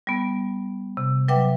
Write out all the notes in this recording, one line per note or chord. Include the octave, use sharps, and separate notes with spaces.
G3 B3
C3
F#3 B4 E5 G5 D6